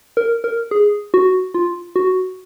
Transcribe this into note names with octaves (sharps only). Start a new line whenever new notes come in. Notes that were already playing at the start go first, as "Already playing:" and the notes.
A#4
A#4
G#4
F#4
F4
F#4